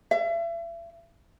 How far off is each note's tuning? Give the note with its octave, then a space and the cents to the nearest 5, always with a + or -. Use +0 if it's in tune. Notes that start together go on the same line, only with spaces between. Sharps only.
E5 +40